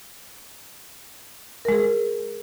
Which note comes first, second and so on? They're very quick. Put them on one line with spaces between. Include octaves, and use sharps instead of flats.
A#4 G#3 G#4